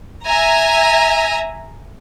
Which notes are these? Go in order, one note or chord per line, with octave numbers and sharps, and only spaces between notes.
E5 G#5 A#5